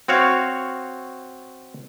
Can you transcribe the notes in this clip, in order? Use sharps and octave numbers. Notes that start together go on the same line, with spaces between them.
C4 F#4 C#5 F5